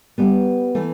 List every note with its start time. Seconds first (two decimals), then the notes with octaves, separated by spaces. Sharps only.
0.18 G3 B3
0.75 E3 A3